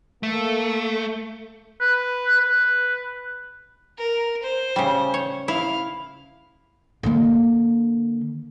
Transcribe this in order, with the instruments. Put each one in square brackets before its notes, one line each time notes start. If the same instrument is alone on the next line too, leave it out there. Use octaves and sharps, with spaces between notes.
[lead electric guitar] A3 [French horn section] A#3 A4
[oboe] B4
B4
[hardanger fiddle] A#4
C5
[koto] C#3 G3
C#5
[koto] E4 [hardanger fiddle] F5
[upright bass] D3 A#3